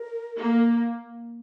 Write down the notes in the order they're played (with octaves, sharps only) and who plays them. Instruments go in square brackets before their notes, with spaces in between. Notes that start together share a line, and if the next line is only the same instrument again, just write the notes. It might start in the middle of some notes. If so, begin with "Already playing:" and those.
Already playing: [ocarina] A#4
[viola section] A#3